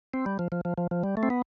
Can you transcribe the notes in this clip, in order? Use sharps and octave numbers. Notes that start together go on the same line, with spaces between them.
C4
G3
F3
F3
F3
F3
F3
G3
A3
C4
B3